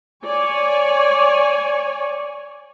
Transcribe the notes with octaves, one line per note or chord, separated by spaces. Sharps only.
C#5 D5 G#5